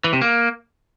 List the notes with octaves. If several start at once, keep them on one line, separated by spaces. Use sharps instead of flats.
E3
C3
A#3